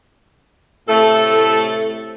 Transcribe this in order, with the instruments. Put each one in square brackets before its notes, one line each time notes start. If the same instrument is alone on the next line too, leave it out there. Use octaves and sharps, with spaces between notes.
[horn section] A2 C3 A3 [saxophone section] A4